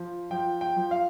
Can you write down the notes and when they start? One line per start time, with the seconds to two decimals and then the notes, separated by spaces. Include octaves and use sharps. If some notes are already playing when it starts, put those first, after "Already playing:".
Already playing: F3
0.31 F3 G5
0.61 G5
0.76 F3
0.91 F5